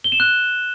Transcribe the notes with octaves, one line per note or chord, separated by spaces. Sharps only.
G7
E7
F#6